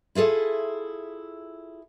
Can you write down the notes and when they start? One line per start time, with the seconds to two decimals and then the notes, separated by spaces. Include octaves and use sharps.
0.15 E4 F4 G#4 A4 E5